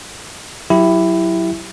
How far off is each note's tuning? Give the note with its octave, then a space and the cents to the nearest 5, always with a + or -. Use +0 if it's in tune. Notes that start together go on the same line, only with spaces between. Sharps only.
F#3 +0 E4 +5 G4 +0